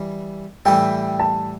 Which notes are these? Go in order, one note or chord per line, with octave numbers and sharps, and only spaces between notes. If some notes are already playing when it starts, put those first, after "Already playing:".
Already playing: E3 G3
A2 E3 G3 E4 A4 G5
A5